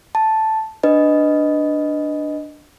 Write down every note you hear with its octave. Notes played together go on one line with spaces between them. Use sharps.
A5
D4 B4 D#5